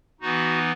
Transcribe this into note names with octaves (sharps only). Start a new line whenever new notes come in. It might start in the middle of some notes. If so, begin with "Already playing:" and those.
E3 B3 D#4 F#4